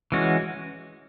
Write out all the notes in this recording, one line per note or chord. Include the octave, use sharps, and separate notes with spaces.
E3 G#3 C#4 F#4